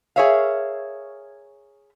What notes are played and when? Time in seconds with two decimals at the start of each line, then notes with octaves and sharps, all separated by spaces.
0.16 G#4 A#4 C#5 E5 F5